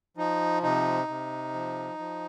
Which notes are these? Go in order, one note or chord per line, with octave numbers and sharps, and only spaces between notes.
F3 D#4
C3 D#4
C3
F3
F3